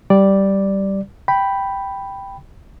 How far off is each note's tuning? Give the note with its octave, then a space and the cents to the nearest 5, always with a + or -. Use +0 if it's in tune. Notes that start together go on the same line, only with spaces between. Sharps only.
G3 -5 D5 +0
G5 +0 B5 +0